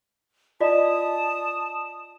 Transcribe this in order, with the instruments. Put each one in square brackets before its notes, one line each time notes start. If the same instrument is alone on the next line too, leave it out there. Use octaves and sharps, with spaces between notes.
[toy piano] F4 D5 D#5 [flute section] A5 D#6